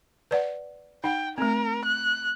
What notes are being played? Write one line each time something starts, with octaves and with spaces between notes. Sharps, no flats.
B4 D5 F#5
D#4 F#5 G5
A3 C4 A#4
F#6